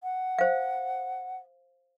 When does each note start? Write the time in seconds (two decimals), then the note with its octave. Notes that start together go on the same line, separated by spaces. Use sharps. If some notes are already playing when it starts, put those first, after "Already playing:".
0.03 F#5
0.39 C5 F5